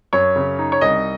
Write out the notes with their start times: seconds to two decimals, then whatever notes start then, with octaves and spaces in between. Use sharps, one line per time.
0.13 F#2 C#5
0.36 C#3
0.59 D#4
0.72 C#5
0.81 C2 D#5